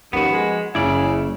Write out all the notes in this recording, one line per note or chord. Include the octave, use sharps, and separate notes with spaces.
D#2 F3 B3 C#4 F#4
G#3
F#1 C#3 C#4 E4 D5